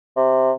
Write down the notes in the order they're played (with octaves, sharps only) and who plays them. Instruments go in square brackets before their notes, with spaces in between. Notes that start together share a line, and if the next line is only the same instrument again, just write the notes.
[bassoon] C3